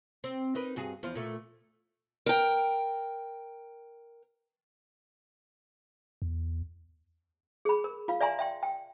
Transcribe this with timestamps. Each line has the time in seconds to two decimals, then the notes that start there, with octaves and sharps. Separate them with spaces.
0.24 C4
0.55 D#4 A#4 B4
0.76 G2 F#4 G#4
1.03 E2 F3 F4
1.15 A#2 A3
2.26 A#4 G5
6.22 E2
7.65 G#4 B5
7.84 A#4
8.08 F4 F5
8.21 D5 E5 G#5 A#5 C6
8.39 E5 G5 C6
8.63 G5